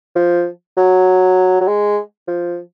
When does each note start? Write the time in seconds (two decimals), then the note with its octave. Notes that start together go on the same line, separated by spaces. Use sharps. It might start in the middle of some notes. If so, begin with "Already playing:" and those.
0.16 F3
0.77 F#3
1.61 F#3
1.68 G#3
2.28 F3